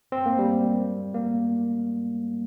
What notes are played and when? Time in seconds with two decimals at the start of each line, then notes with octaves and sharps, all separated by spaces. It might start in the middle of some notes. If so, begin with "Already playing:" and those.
0.12 C4
0.26 A#3
0.39 G3
1.14 A#3